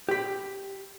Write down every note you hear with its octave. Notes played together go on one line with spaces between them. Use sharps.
G4 B5